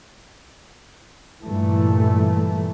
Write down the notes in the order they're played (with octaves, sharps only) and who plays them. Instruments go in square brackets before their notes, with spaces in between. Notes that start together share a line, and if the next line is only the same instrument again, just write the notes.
[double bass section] G2 A#2 E3 A3